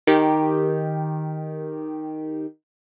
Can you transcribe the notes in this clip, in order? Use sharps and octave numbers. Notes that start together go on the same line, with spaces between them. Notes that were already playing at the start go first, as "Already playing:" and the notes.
D#3 G4